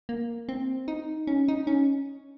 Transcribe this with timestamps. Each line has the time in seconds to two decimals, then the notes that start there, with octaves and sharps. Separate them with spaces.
0.09 A#3
0.49 C4
0.88 D#4
1.27 C#4
1.48 D#4
1.67 C#4